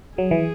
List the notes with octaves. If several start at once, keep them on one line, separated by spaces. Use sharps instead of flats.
F#3 G#4
E3